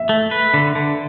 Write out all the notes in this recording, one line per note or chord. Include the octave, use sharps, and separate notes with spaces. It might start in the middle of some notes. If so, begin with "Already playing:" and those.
Already playing: E5
A3
B4
D3
D3